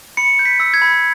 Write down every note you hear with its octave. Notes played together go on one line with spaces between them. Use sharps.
B5 C#7
G6
B6
E6
G#6
B5